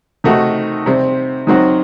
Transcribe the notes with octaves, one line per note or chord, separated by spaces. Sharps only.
C3 D#3 A3 D#4 F#4
C3 G3 C4
D#3 F#3 C4 F#4